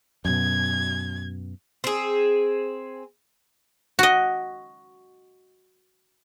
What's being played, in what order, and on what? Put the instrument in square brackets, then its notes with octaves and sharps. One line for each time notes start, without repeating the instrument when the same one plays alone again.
[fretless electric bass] F#2 B2 [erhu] G#6
[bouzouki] C4 G#4
[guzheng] F#4 D#5